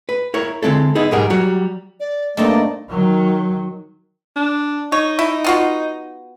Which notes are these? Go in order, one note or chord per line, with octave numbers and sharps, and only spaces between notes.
B4
E4 A#4 C#5
D3 G#3 C4 E4 A4
B3 D#4 E4 G#4
B1 G#2 G3 G#4 A#4 F#5
F#3 G3 F#4
D5
G2 A3 A#3 C4 D#4 D5 D#5
D#3 F#3
D4
D#4 C#5
E4
B3 F4 F#4